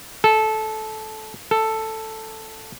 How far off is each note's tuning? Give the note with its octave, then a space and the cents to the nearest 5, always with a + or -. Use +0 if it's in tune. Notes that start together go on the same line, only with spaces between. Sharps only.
A4 -15
A4 +5